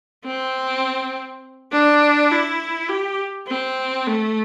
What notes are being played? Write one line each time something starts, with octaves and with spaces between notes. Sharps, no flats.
C4
D4
E4
G4
C4
A3